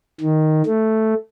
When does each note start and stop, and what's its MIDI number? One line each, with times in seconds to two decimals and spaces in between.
0.21 0.62 51
0.66 1.14 57